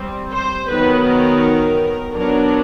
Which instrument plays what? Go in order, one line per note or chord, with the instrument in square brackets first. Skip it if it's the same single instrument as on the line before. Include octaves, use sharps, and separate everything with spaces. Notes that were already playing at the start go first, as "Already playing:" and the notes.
Already playing: [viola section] G3 C4
C5
D#3 F#3 B3 B4
A#4
F#3 B3 D4 A#4